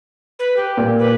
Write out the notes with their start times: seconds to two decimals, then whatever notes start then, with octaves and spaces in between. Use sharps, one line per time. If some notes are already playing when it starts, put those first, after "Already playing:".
0.39 B4
0.56 G4
0.77 A#2
0.98 B4